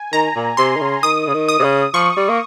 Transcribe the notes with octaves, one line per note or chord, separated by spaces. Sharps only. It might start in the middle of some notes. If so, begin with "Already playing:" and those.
Already playing: G#5
D#3 A#5
A#2
C3 C6
D#3
C#3
D#3 D#6
C#3
D#3
D#6
C3
C#3
F3 C#6
G3
A#3